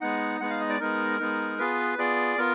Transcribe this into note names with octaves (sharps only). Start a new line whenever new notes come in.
G#3 B3 D#4 F#5
G#3 B3 D#4 F#5
F5
D#5
D5
G#3 B3 D#4 A#4
G#3 B3 D#4
B3 F4 G#4 B4
B3 F4 G#4 D5
B3 F4 A#4